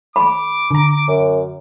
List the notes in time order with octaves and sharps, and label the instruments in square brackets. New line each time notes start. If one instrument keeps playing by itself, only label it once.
[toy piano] B5 [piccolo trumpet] D6
[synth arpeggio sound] D3 A#5
[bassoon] F#2